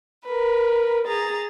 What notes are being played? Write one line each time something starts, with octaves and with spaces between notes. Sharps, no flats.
A#4 B4
G#4 A#5 A6